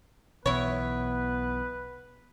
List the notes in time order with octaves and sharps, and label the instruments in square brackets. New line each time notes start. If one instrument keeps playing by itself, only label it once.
[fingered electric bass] B1 B2 E3 [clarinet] B3 [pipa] E4 C#5 [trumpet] B4